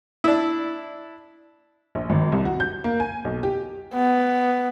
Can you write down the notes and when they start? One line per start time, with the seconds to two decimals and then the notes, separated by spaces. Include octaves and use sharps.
0.24 D4 E4
1.95 A#1
2.10 G#1
2.32 C2
2.45 F#4
2.60 G6
2.84 A#3
3.00 G#5
3.25 B1
3.43 G4
3.94 B3